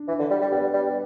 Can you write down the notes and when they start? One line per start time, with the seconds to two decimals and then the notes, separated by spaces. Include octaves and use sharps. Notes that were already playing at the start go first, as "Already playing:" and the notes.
Already playing: D4
0.08 E3
0.19 D3
0.31 G3
0.41 G3
0.52 G3 B3
0.74 G3